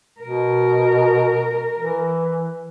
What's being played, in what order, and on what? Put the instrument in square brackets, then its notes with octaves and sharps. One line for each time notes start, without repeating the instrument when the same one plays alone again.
[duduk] B2 [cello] A#4
[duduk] E3